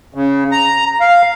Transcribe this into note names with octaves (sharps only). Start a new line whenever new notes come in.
C#3
A#5
F5